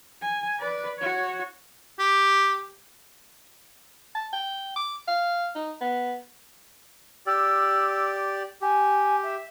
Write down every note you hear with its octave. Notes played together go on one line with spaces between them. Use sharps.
G#5
B4 D5
F#4 C#5
G4
A5
G5
D6
F5
D#4
B3
G4 D5 E6
G4 G#5
E5